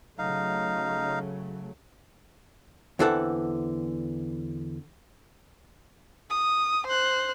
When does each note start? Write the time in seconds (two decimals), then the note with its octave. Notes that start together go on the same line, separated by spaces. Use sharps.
0.19 C#3 F#3 A3 D#4 F5
2.99 E2 D3 E3 C4 A4 F#5
6.30 D#6
6.87 C5 F#6